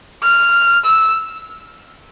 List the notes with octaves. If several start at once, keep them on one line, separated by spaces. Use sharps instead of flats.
F6
E6